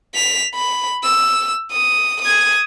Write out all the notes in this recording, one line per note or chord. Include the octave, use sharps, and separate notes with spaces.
B6 F7
B5
E6
D#6
D#6 G#6